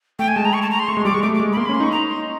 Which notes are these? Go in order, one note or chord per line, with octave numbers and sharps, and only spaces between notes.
A3 G5
G#5
G#3 A5
A#5
C#6
A5
A#5
C6
A3 C#6
G#3 C6
G3 D6
G#3 C#6
A3 D6
D6
G#3
B5
A#3 C6
B5
C#4
C6
D#4 C#6
A#5
C6